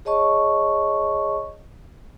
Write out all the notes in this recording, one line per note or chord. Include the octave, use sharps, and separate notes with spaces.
G#4 C#5 D#5 A5 C#6